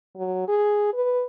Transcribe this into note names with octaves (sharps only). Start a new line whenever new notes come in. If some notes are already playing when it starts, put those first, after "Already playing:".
F#3
G#4
B4